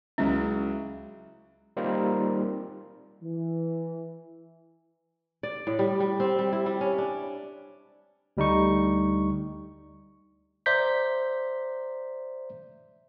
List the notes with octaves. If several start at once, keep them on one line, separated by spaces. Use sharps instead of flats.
C#2 F#3 C#4 E4
G3 A#3 C4 D#4 F4 A#4
E3
D5
A2
G3
G3
C4
G3
E4
G3
C#4
D4
D2 G3 D#4 C#6
C5 D5 E5 A#5 G6 B6